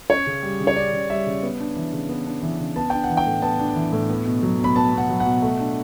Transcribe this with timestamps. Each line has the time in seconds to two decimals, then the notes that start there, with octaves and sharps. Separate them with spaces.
0.10 C#4 C#5
0.27 C#3
0.43 G3
0.60 C#3
0.67 C#5
0.76 C#4 D5
0.93 C#3
1.09 G3 E5
1.27 C#3
1.43 B3
1.60 D4
1.76 E3
1.93 C#3
2.09 B3
2.26 D4
2.43 E3
2.60 C#3
2.76 B3 A5
2.90 D4 G5
3.04 F#5
3.10 E3
3.17 G5
3.26 A2
3.42 B3 A5
3.59 D4
3.76 E3
3.93 A2
4.09 B3
4.26 B2
4.43 F#3
4.60 B2 B5
4.76 B3 A5
4.93 B2 F#5
5.09 F#3
5.20 F#5
5.26 B2
5.42 A3
5.59 D4